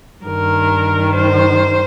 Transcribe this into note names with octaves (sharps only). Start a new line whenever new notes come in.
G2 D#3 A#4
C5